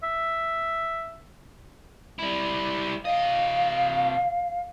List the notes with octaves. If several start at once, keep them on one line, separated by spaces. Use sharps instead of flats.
E5
G3 E4
C3 D#5 F5